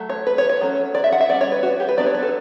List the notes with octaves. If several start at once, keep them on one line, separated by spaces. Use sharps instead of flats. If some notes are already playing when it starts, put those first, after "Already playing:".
Already playing: F#3 A3
C#5
B4
C#5
C#5
F#3 A3 C#4
D5
E5
F#5
E5
G3 C#4 D5
C#5
B4
F#4
G4
B4
F#3 B3 D4 D5
C#5
B4
A4